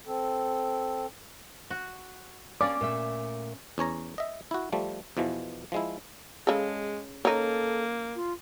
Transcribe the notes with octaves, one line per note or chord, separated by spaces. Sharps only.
C4 A4
F#4
A#3 C#4 D5 F5 D6
A#2 A3 E5
E2 C#4 C#5 A#5
D#5 E5
E4 F#4
F3 G3 A3
E2 B2 E3 F3
F3 G#3 E4
C#3 G#3 A4
A#3 C#4 D#4 A4
F4